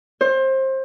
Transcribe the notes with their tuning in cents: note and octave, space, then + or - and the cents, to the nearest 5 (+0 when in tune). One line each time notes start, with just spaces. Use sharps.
C5 +25